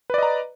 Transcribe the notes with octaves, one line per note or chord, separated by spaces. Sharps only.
B4 D5 D#5 A#5